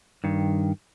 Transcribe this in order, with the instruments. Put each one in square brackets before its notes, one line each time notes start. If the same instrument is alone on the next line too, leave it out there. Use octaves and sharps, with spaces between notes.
[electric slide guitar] G2 D#3